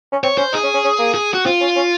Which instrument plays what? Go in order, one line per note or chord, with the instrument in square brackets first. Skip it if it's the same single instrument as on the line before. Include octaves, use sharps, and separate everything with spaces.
[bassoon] C#4
[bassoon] C4 [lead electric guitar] C#5
[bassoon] C#4 [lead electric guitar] C5
[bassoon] D#4 [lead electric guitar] G#4
[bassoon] C#4
C#4
C#4
A#3
[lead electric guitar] G#4
F#4
[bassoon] C4 [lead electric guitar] F4
[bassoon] C#4
C#4